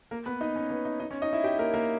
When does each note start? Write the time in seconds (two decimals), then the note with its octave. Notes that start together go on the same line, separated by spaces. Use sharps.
0.11 A#3 A#4
0.26 B3 B4
0.41 D#4 D#5
0.56 C#4 C#5
0.70 B3 B4
0.85 D#4 D#5
1.00 D#4 D#5
1.11 C#4 C#5
1.22 D#4 D#5
1.33 E4 E5
1.44 G4 G5
1.59 A#3 A#4
1.74 A#3 A#4